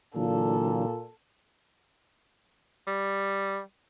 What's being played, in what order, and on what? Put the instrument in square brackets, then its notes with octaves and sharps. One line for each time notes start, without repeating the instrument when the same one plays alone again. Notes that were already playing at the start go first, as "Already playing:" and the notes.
[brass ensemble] A#2 [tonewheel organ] D3 E3 F#3 [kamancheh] A4
[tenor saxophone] G3